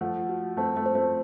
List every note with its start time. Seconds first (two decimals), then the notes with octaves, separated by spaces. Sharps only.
0.01 F3 A3 F#5
0.29 F#4
0.57 A3 C4 A5
0.76 F3 A3
0.86 C5
0.95 A3 C4